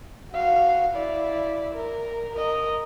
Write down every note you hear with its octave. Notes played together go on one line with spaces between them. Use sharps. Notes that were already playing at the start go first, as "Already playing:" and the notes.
F#4 F5
E4 D5
A#4
A#4 D#5